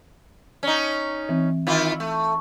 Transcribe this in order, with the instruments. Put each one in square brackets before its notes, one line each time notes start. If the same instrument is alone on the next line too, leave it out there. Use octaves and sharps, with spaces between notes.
[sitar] C#4 D#4
[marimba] E3 C4
[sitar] D#3 E4 F4
A3